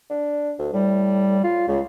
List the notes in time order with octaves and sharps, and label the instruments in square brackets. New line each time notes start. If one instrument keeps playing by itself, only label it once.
[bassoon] D4
D2
[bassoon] A2 [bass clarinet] G3
[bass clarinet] F4
[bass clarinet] C#2 [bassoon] C#3